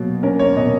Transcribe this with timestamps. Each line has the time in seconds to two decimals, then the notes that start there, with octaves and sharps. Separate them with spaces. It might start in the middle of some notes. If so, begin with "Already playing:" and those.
Already playing: B2 F#3 A#3
0.23 C#4 A#4
0.39 C#5
0.56 B2 D#5